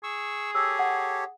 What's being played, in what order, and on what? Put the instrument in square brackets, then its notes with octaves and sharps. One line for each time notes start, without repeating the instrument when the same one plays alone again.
[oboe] G#4 [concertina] C#6 E6
[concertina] G4 A4 C#5 [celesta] E6
[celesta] F#5